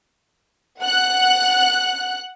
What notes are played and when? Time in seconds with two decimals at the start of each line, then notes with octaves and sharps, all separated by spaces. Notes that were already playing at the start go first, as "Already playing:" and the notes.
0.81 F#5 F#6